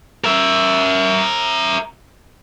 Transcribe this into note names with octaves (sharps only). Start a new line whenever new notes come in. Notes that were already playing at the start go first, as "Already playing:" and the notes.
A#4 E5